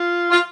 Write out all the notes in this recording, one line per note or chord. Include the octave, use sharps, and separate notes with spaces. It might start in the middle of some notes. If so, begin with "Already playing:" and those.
Already playing: F4
F4